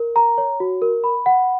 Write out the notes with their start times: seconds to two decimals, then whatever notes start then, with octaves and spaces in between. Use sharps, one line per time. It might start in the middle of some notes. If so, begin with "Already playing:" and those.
Already playing: A#4
0.16 A#5
0.38 C#5
0.60 F#4
0.82 A#4
1.04 B5
1.26 F#5